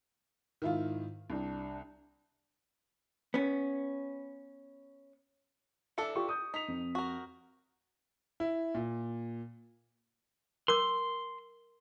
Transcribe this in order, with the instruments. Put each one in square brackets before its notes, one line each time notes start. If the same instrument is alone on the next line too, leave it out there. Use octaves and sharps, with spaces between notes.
[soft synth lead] G#2 [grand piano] D#3 E4 F4
[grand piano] C2 [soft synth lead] D4
[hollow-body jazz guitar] B3 C#4
[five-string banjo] E3 D4 A4 [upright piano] E5 C#7
[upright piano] F4 G4 C#6
D#6 G6
[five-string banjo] D#4 [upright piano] B6 F7
[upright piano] F2
[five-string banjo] F#4 A#4
[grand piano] E4
A#2
[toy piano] A#4 D6 [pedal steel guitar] C6